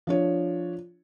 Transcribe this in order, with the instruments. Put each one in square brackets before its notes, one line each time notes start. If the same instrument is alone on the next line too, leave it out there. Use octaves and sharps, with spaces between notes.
[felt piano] F3 D4 C#5